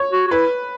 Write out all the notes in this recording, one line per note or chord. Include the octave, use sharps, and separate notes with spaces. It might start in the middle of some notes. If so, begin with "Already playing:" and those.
Already playing: C#5
F#4
F#4
E4 B4